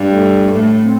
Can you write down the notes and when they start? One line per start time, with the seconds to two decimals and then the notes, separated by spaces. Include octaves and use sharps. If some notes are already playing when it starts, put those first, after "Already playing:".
Already playing: G2
0.09 A3
0.52 A2
0.82 C4